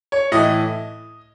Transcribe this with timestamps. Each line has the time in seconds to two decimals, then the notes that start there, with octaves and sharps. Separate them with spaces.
0.12 C#5
0.32 A2 E3 D#5